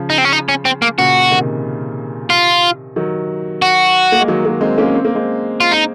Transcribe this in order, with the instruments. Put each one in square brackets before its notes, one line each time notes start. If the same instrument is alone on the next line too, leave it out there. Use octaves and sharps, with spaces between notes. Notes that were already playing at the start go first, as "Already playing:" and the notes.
Already playing: [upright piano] C#3 F3
[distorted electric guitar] D#4
C4
C#4
D#4
C#4
C4
A#3
[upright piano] A#2 C#3 [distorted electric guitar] F#4
[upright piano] C3 D#3
[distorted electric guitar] F4
[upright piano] D#3 F#3
[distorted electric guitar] F#4
[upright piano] A#3
G#3
D#3 F#3
F#3 A#3
G#3 C4
A#3 C#4
C4
A#3
G#3 C4
[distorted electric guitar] F4
D#4